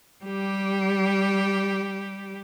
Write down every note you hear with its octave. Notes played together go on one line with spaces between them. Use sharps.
G3 G4